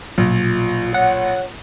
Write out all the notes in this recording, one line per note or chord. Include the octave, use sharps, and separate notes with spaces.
A#1 B2 F#3 F4
C#5 F#5